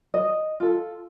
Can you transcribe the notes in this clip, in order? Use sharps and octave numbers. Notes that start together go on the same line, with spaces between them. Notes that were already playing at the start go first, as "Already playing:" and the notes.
D#5
F4 A4